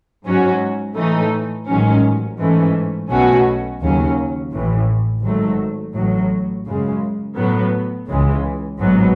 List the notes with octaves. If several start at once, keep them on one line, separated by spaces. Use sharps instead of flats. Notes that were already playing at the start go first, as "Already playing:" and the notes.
G#2 F#3 C#4 F#4
A2 E3 A3 D#4
A1 G#2 D#3 F#3 C#4
G#2 E3 A3 C#4
B1 B2 A3 C#4 F#4
D#2 C#3 F#3 C#4
A1 A2 E3
G#1 G#2 F#3 A3
A1 A2 F#3
F#2 C#3 G#3
A2 F#3 B3
C#2 C#3 E3 G#3
A1 G#2 F#3 B3